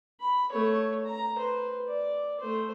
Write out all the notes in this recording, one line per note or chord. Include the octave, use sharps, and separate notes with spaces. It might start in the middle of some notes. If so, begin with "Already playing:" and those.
B5
A3 C#5
A#5
B4 C5
D5
A3 C5